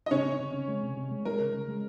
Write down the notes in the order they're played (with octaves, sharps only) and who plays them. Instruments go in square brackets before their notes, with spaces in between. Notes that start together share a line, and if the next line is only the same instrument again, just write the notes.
[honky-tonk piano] D#5
[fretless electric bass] C#3 [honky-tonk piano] C#4 C#5
[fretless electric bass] C4
C#3
C#3
G#3
C3
C3
G#3
[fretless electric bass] G#3 [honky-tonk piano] A#4
[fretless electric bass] C#3
C#3
G#3